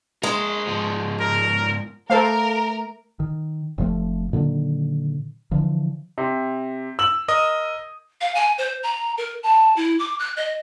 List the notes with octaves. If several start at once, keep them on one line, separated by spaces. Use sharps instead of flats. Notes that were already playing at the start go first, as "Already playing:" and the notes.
G#3 A#4 C5
G#2 F3
A#4
A3 A4 A#4 C5 F5
D#3
F1 C3 F3 A3
A#2 D3 D#3 F#3
D3 E3 F3
C3
E6 F#7
A#4 D#5 D#6
F5
G#5
C5
A#5
A#4
A5
E4
D6
F#6
D#5